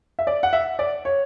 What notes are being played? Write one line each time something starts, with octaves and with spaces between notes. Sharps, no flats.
E5
D5
F#5
E5
D5
C#5